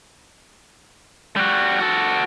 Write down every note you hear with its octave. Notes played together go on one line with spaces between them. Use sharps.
G3 F#4
F#4 A4